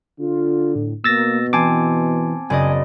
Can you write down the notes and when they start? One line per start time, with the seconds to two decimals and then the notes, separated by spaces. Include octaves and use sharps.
0.19 D3 F4
0.75 A2
1.04 B2 A#3 E6 A6 A#6
1.53 E3 C4 G#5 A5 D6
2.50 F#1 D5 D#5 G#5